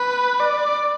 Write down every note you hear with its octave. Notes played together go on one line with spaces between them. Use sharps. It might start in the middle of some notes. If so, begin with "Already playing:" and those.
Already playing: B4
D5